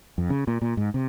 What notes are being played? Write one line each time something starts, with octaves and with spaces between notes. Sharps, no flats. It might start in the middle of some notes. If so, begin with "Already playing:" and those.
F2
C#3
A#2
A#2
G#2
C3